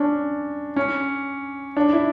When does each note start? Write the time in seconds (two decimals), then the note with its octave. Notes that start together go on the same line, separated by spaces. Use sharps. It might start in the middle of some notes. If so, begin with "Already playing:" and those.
Already playing: C#4 D4
0.76 C#4
1.77 D4
1.93 E4